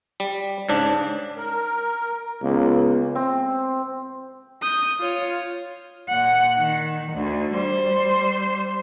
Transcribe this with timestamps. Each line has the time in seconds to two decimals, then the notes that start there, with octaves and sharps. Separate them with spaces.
0.20 G3
0.69 G#2 C#3 D4
1.37 A#4
2.42 C#2 A#3 B3
3.15 C4
4.62 D#6 G6
5.00 F4 C#5
6.10 A#2 F#5
6.58 D#3
7.13 D2
7.54 G3 C5